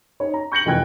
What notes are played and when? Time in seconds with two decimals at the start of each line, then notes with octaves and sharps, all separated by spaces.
0.20 D#4 C#5
0.34 A#5
0.52 C#6 G6 A#6 C#7 F#7
0.65 F1 F2 E3 G5 F#6 G#6